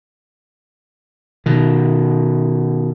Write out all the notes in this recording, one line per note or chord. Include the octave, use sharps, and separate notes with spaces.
B2 D#3